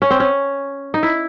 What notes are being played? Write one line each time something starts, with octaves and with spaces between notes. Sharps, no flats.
C#4
C4
C#4
D#4
E4